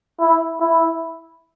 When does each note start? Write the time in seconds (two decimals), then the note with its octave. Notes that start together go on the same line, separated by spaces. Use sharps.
0.20 E4
0.60 E4